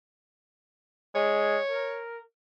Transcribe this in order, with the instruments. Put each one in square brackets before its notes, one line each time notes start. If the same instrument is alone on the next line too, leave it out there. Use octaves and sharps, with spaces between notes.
[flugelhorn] G#3 [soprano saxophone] C#5
[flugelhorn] A#4